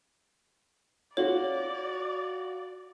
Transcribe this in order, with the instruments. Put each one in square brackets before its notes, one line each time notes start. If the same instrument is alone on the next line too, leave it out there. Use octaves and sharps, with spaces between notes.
[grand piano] F4 F#4 F#7 [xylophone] C#5 [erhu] D5